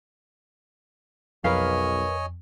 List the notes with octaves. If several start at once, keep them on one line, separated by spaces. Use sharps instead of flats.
B1 F2 A#4 B4 C#5 D#5 F5 G#5